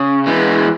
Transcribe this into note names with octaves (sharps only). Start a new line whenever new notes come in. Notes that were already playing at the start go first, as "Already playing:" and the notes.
Already playing: C#3
E3 G#3 B3